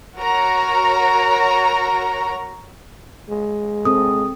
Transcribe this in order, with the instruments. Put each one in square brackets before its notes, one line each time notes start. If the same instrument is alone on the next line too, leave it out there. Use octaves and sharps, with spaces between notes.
[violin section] F#4 A#4 C#5 A#5
[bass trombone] G#3
[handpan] C4 A4 [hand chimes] D#6